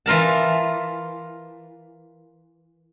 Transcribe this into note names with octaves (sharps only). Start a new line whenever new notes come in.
E3 F4 A#4 A5